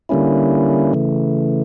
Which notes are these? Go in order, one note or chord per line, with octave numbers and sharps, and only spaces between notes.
D3 G3 A#3 C#4 E4
C#3 E3 A3